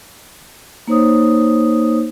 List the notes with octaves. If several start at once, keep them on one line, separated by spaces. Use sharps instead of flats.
A#3 D#4 C5 C#5 D#6